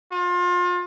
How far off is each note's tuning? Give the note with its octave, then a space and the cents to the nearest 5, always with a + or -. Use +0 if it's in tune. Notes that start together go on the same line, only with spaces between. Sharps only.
F4 +30